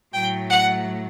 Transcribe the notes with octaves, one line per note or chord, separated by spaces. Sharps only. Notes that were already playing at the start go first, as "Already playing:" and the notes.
A2 F#3 A3 G5
F#5